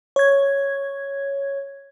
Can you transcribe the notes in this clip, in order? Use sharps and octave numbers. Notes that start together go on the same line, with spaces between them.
C#5 G#6